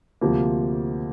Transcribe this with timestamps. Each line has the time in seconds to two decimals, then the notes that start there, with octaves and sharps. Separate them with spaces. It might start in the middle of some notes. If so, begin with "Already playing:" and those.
0.21 D2 C3 F3 A#3